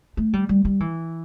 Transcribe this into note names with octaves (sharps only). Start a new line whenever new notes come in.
A3
G3
G3
G3
E3